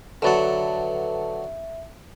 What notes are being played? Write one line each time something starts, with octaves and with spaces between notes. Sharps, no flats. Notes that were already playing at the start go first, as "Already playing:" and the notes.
D3 F#3 A4 B4 E5 F#5 A5